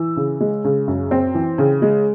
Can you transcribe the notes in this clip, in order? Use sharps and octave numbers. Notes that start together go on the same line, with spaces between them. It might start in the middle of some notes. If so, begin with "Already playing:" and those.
Already playing: E3 E6
C#3
G#3
C#3
F#2
C4
E3
C#3
G#3